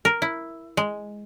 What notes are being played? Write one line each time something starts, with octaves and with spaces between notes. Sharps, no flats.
A#4
E4
G#3